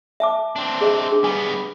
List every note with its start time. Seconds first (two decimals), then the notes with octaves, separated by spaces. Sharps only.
0.20 E5 A5 D6
0.56 C4 D4
0.81 G#4 D#5 E5
1.11 D4 G#4
1.24 G3 B3 G#5